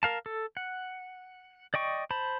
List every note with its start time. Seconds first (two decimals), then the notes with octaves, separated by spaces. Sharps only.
0.03 A#4 F5 A5
0.26 A4
0.57 F#5
1.74 D5 D#5 G5 C#6
2.11 C5 A5 B5